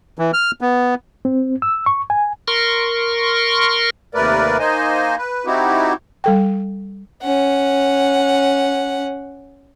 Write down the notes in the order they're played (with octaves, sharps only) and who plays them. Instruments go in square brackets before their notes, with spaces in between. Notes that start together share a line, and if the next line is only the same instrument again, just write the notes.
[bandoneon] E3
F6
B3
[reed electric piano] C4
E6
C#6
G#5
[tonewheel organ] A#4 C6 C#6
[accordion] D#2 C3 A3 A#4 B4 D5
A#3 D#4 C5 D#5 G#5
B4
C4 D#4 E4 F#4 G4
[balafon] G3 A4 G5
[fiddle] C#4 F#5